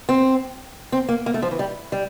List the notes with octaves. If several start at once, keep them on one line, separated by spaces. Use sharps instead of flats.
C4
C4
A#3
A#3
A3
F3
E3
G3
G3